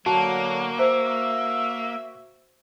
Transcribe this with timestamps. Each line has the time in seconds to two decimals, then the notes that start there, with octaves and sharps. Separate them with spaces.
0.06 D3 F#3 A#3 F#4 A5
0.79 C5 E5